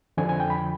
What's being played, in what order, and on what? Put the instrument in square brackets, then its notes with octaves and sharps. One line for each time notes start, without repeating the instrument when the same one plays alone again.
[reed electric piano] F2 D3 F3 G#5
G#5
G5
B5